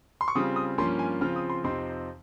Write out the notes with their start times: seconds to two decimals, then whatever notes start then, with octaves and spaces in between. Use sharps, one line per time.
0.21 C6
0.28 C#6
0.35 C#3 G3 C4 F4 D#6
0.56 D#6
0.78 G2 F3 A#3 C#4 F4 C6
0.99 G#5
1.21 C#3 F3 C4 F4 F6
1.36 D#6
1.50 C6
1.64 F2 C3 F3 C4 D#4 C6